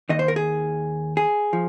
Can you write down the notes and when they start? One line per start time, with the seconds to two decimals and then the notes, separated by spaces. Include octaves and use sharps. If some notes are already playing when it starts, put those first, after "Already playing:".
0.09 D#2 D#3 D#5
0.19 C5
0.28 A#4
0.36 G#4
1.17 G#4
1.53 F3